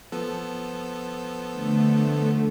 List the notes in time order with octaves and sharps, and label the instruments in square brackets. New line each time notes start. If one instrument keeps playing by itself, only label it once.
[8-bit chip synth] F3 B3 A4
[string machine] D3 A3